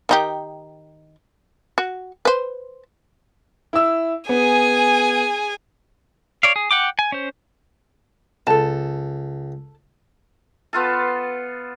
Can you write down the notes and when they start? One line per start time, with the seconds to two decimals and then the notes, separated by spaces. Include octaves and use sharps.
0.09 D#3 D#4 G4
1.78 F#4
2.25 B4 C5
3.73 E4 E6
4.29 B3 G#4 G#5
6.43 C#5 D5 F5
6.56 G#4
6.71 F#5 G5 D6
6.99 G#5
7.12 C#4 C5
8.47 C#2 A4 A5
10.73 B3 F4 A4